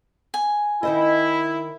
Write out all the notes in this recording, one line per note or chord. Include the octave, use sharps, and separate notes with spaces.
G#5
D#3 E4 C5 D#5